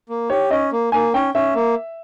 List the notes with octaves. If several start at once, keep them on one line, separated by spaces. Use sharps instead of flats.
A#3
G4 C#5
C#4 D#5
A#3
A#3 G#5
C#4 G5
C#4 E5
A#3